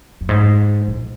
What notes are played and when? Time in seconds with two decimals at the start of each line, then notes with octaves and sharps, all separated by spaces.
0.21 F2
0.29 G#2
0.88 A#2